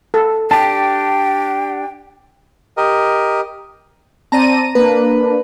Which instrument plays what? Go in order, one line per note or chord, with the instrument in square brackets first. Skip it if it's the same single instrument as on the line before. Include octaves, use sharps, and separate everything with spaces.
[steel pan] A4
[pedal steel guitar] D4 G4 [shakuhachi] G5 [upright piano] A5
[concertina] G4 A#4 D#5
[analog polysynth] C4 D5 D#7 [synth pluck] A5 A#5 A#6
[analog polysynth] A#3 D4 [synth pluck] B4